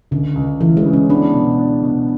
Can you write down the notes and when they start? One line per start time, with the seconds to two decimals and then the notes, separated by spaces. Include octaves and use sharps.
0.11 C#2 D3
0.36 C#2
0.60 E3 A3
0.77 G#3
0.85 C#3
0.93 C#4
1.09 B3 D4
1.34 B2
1.58 D4
1.83 B2